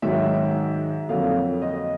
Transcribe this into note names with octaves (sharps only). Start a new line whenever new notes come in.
G#2 D#3 F#3 E5
F2 D3 F#3 A#3 F5
D#5